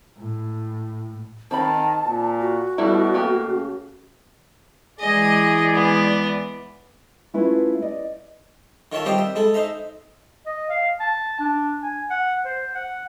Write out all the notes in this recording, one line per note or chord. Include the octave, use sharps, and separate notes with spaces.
A2
D#3 C4 A5 B5
A#2
F#4
B2 G3 A3 E4
A3 A#3 G4
C#3
E3 G#3 G#4 D5 D#5
B3
A3 C#4 E4 F4 B4
D5 D#5
D#3 F4 C#5 E5 A5
G3 C4 F4 G4 C5 D#5
E5
G#3 E4 A4
D#4 C5 E5 A#5
D#5
F5
A5
D4
G#5
F#5
C5
F#5